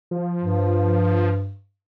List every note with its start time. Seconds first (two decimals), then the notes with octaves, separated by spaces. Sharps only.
0.11 F3
0.41 G2